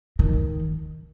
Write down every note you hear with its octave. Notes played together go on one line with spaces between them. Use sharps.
D#3